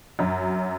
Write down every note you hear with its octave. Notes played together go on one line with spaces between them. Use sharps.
F#2 F#3